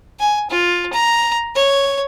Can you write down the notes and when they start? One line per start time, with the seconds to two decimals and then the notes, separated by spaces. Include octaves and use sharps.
0.20 G#5
0.50 F4
0.93 A#5
1.55 C#5